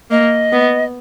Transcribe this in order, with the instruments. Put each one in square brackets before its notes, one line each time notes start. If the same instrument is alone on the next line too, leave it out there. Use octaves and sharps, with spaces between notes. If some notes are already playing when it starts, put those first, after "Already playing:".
[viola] A#3 [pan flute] D#5
[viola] B3